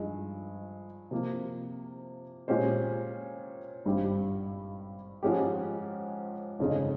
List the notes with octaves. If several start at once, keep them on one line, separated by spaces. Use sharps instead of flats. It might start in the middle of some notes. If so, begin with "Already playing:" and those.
Already playing: G2 F3 G#3 D#4
C3 F3 A#3
A#2 G#3 C#4 G4 C5
G#1 G2 G3 C4 G4
G#2 F3 G#3 C#4 G4
G1 F2 C#3 G#3 D#4